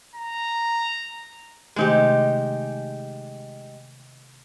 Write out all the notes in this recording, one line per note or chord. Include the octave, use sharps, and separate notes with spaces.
A#5
C3 D#3 G#3 A3 D#4 G4